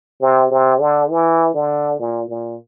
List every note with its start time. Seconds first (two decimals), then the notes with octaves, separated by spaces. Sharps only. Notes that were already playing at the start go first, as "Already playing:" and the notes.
0.21 C3
0.51 C3
0.81 D3
1.11 E3
1.55 D3
2.00 A#2
2.29 A#2